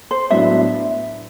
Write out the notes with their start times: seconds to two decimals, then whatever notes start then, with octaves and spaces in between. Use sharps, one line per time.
0.11 C5
0.30 A2 F#3 B3 D4 E5